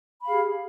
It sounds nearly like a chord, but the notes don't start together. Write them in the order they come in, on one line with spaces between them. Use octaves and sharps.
B5 F5 G#4 G4